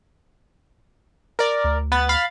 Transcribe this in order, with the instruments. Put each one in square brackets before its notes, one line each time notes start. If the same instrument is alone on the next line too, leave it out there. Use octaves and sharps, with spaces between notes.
[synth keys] A#4 D5
[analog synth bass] D2
[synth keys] B3 B4 A6
F5 B5 A6